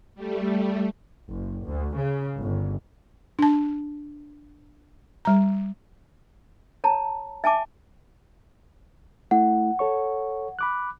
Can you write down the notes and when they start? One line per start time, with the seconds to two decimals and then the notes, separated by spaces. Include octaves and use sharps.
0.15 G3 A3
1.32 F#1
1.65 D2
1.97 C#3
2.40 G1
3.39 D4 A5
5.25 G3 A#5
6.84 C#5 A5 A#5
7.44 E5 G#5 A5 D6
9.31 A3 E4 F#5
9.79 A4 C#5 C#6
10.59 B5 D6 F#6